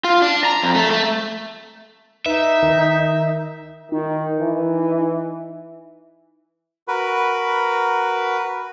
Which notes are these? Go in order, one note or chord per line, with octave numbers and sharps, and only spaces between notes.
F4
D4
A#5
F2
A3
A3
D#4 B4 E5
D#3
D#3 D#4
E3
F#4 A#4 B4 B5